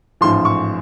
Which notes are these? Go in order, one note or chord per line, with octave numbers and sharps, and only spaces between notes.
A1 G#2 F3 C6
C#6